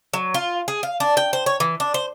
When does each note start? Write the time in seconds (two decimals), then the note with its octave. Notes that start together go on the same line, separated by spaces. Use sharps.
0.14 F#3
0.34 F4
0.68 G#4
0.83 F5
1.00 D4
1.17 G5
1.33 C5
1.46 C#5
1.60 E3
1.80 D4
1.94 C5